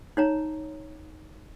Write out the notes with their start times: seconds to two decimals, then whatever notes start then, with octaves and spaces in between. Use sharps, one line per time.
0.17 D#4 C#5 A#5